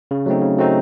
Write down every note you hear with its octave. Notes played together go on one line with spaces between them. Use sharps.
C#3
F#3 A3 C4 D#4
C#3
F#3 A3 C4 D#4